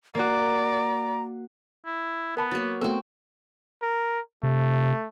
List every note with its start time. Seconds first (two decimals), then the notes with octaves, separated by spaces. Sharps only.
0.15 A#3 F#4 D5 A#5
1.86 E4
2.37 B3 A#4 A5 B5
2.51 F#3 A#3 A6
2.81 A3 B3 C4 F#4 A4
3.82 A#4
4.43 C3 A3